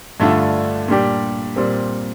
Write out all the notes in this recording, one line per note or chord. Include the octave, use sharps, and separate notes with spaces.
G2 D3 A3 D4 F4
A#2 G3 D4 G4
A#2 G3 C4